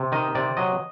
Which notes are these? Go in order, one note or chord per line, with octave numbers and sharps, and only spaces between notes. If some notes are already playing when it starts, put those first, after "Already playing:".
Already playing: C3
D#3 D#5
C3 D5
F#3 D#5